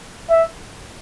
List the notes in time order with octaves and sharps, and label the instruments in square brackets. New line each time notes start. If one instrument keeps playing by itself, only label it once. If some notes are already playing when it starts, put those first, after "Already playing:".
[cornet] E5